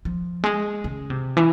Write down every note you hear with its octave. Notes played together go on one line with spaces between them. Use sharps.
F3
G#3
C#3
C3
E3